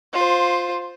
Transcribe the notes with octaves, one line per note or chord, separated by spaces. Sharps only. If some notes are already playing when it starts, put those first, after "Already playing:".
F4 C5